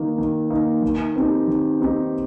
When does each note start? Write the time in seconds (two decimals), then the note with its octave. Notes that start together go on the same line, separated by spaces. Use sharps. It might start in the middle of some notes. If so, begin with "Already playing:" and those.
Already playing: D#3 A#3 D#4
0.18 D#3
0.50 A#3 D#4
0.82 D#3
1.16 C4 D#4 G4
1.48 D#3
1.81 C4 D#4 G4